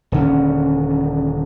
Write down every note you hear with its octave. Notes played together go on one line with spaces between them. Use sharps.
D#1 D3 C#4